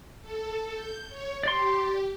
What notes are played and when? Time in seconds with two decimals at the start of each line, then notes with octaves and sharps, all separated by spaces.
0.21 A4
0.74 G6
1.09 C#5
1.43 G4 D5 C6